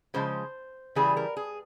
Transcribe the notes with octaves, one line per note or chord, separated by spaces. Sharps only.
C#3 F3 G#3 C5
C#3 E3 G3 G#4
A#4
G#4